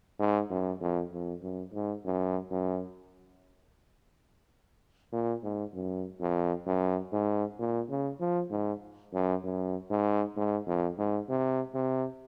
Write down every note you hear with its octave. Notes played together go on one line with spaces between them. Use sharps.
G#2
F#2
F2
F2
F#2
G#2
F#2
F#2
A#2
G#2
F#2
F2
F#2
G#2
A#2
C#3
F3
G#2
F#2
F#2
G#2
G#2
F2
G#2
C3
C3